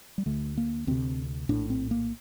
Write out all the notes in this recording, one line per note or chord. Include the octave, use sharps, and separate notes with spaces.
G3
D2 D3 A3
A#3
D2 C3 C4
A#1 A2 D4
C4
A#3